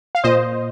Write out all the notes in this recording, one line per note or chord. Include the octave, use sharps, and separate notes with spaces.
F5
A#2 C5 D#5